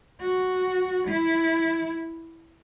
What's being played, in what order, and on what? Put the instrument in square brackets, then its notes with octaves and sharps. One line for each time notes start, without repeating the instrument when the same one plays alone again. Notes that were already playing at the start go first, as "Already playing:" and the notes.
[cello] F#4
E4